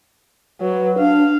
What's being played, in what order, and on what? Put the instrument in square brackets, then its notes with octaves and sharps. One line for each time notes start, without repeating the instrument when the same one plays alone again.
[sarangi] F#3 [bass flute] B4
[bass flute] D4 [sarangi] F5